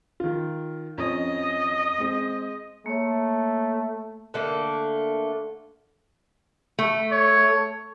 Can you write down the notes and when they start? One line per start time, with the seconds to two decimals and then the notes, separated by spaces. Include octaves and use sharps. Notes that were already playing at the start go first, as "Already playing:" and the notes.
0.20 D#3 F4
0.98 F2 C#4 D#5
1.98 G#3 C4
2.86 A3 A#3 C#5
4.34 D3 A3 A#3
6.79 A3
7.12 C#5